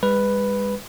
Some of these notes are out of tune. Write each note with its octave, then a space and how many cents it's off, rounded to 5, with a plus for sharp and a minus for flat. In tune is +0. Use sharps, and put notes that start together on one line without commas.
G#3 -45 B4 +0